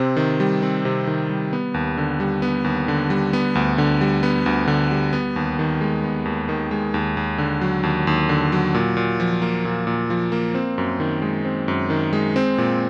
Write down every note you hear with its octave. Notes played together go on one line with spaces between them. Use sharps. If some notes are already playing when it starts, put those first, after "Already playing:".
Already playing: C3 C4
D#3
G3
C4
C3
D#3
G3
B3
D#2
D3
G3
B3
D#2
D3
G3
B3
D2
D3
G3
B3
D2
D3
G3
B3
D#2
D#3
G#3
B3
D#2
D#3
G#3
D#2
D#2
D3
F#3
D#2
D#2
D3
F#3
A#2
A#2
F3
A#3
A#2
A#2
F3
A#3
C4
F#2
D#3
G#3
C4
F#2
D#3
G#3
C4
A#2